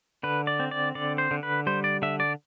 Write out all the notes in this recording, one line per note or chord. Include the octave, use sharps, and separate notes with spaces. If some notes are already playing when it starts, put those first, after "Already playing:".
D3 B4
D5
C4
D5
D3 D5
C5
D3
B4
G3 C5
D5
D3 E5
D5